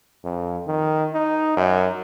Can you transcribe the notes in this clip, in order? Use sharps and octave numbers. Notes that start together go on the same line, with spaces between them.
F2
D#3
D#4
F#2